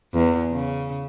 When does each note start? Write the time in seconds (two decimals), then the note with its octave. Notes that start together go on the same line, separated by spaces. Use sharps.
0.14 E2
0.52 C#3